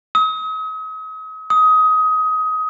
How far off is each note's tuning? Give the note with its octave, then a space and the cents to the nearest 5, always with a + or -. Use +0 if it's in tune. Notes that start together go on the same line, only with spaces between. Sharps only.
D#6 +40
D#6 +20